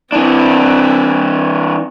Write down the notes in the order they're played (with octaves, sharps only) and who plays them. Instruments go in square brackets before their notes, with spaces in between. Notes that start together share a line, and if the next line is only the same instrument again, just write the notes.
[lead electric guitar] E3 D4 [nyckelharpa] C4 E4